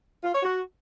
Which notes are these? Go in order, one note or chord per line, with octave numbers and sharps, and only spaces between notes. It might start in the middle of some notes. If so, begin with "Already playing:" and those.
F4
C#5
F#4